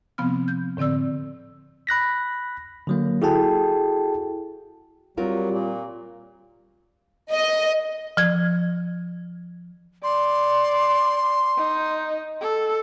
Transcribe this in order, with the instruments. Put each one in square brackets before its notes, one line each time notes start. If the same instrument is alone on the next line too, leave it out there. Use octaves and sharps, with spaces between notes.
[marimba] C3 F3 B3 C4 F6
G6
A2 D3 C4 D5 E6
[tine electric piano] B5 F#6 A#6 B6
D3 F#3 A#3
E4 F#4 G#4 A4 G5 A5
[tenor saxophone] F#3 [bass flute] G3 [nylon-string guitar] C4 F4 A#4
[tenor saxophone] A#2
[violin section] D#5
[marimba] F3 G#6
[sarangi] D5 [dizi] C6
[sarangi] D#4
A4